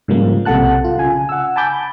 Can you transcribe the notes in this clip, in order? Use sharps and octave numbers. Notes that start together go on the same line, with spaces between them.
G#2 C#3 F3 G3 A#3
B1 C3 A4 F#5 A5 F#6
F4
C#3 G#5
F#5 E6
G#5 A5 B5 D6 G6